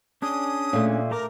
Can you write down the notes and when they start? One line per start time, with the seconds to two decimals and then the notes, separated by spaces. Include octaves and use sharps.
0.22 C#4 D4 G#4 D#6
0.73 A#2 A3
1.11 A3 A#4 A#5 D6